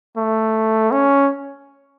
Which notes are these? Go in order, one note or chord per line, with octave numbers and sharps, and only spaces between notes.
A3
C#4